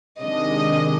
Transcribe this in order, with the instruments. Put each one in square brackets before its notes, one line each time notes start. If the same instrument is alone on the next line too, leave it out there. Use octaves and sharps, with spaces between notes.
[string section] C3 D#3 G#3 D4 D#5